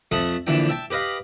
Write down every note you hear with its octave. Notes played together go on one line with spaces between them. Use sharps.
F2 A3 A4 E5 F#5 D#6
A#1 D3 E3 D4 E4 G5
E5 G5 A5
G4 B4 D#5 F5